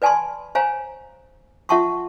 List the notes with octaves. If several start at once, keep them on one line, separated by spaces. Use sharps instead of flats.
B4 D5 G#5 A5 B5 C6
C5 C#5 F5 G#5 A#5
F4 E5 F#5 A5 C6 C#6